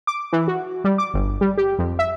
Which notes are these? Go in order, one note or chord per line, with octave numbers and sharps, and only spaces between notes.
D6
E3
F#4
G3
D6
G1
G3
G4
F2
E5